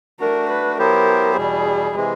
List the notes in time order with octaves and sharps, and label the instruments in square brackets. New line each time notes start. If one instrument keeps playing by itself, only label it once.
[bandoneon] A3 D4 F#4 [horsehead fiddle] A#4
[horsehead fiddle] B4
[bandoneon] F#3 B3 E4 G4 C5 [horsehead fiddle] A#4
[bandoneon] E2 B2 G3 [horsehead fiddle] G#4
[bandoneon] C3 E3 G#3